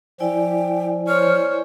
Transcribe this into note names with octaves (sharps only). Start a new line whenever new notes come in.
F3 E4 D5 G5 G#5
C5 C#5 F6